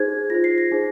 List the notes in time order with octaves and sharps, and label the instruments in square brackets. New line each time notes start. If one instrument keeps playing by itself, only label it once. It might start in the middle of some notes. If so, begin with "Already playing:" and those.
Already playing: [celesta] D#4 G#4 C5 G#6
F4 C5 A#6
C7
A#6
D#4 G#4 C5